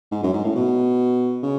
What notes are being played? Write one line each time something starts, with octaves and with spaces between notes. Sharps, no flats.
G#2
F#2
G#2
A2
B2
C#3